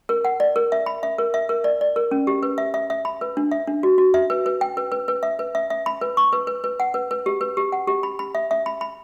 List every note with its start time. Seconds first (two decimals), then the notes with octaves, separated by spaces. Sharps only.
0.09 A#4
0.25 F#5
0.40 D5
0.56 A#4
0.72 E5
0.86 B5
1.03 E5
1.18 A#4
1.34 E5
1.49 A#4
1.64 D5
1.81 D5
1.96 A#4
2.11 C#4
2.27 G4
2.43 B4
2.58 E5
2.74 E5
2.90 E5
3.05 B5
3.21 B4
3.37 D4
3.51 E5
3.67 D4
3.83 F#4
3.98 F#4
4.14 E5
4.30 B4
4.46 B4
4.61 G5
4.77 B4
4.92 B4
5.08 B4
5.23 E5
5.39 B4
5.55 E5
5.70 E5
5.86 B5
6.01 B4
6.17 C#6
6.33 B4
6.47 B4
6.64 B4
6.80 F#5
6.94 B4
7.11 B4
7.26 G4
7.41 B4
7.57 G4
7.72 F#5
7.87 G4
8.03 B5
8.19 B5
8.35 E5
8.51 E5
8.66 B5
8.81 B5